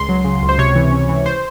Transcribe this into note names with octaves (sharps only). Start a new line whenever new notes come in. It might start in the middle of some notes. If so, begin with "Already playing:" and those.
Already playing: C#2 C6
F#3
C#3
C#2
C5
C3 C#5
E3
C#4
E3
C5